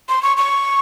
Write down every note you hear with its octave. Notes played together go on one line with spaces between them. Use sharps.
C6
C#6
C#6